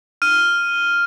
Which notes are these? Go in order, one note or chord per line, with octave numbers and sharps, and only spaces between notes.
F6 D#7